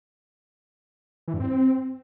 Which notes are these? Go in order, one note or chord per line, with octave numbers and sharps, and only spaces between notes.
E3
G2
C4